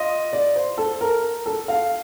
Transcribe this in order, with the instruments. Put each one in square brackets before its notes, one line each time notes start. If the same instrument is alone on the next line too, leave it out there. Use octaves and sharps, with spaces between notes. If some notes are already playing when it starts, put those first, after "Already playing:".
Already playing: [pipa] F4 [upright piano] D#5
[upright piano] D5
C5
A4
A#4
A4
F5